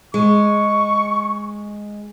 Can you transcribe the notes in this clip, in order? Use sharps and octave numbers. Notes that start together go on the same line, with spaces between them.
G#3 C#6